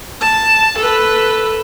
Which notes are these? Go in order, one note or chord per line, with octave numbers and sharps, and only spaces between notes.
A5
A4 B4